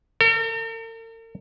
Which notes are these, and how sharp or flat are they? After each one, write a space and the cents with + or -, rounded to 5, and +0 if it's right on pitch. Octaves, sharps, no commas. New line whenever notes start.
A#4 -45